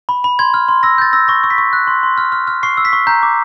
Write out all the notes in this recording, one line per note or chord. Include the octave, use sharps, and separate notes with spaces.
B5
B5
C6 G#6
F6
C6
E6 A#6
G6 A6
E6 A#6
C#6 A#6
C#6
B6
C#6
F#6
C6
C6
F6
F6
F6
C#6 C7
E6
B6
C#6
A#5 G6
D6